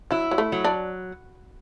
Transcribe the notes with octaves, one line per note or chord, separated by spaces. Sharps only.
F#3 E4
F#3
A3
F#3
D4